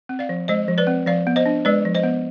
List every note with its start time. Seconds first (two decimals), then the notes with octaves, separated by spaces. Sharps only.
0.09 C4
0.19 D5 F5
0.29 F3
0.48 G#3 C5 D#5
0.68 F3
0.78 B4 D5
0.87 C4
1.06 F3 D5 F5
1.27 B3
1.36 C5 D#5
1.46 D4
1.65 G#3 B4 D5
1.85 F3
1.95 C5 D#5
2.04 B3